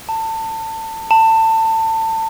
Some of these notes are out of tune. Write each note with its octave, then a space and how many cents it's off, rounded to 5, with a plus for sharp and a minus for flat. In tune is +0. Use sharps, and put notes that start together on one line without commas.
A5 +25
A5 +25